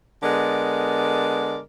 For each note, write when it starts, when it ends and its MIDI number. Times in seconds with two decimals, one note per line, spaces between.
0.23 1.59 50
0.23 1.59 56
0.23 1.59 59
0.23 1.59 70
0.23 1.59 74